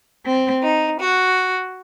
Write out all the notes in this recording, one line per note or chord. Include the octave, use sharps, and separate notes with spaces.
C4
D#4
F#4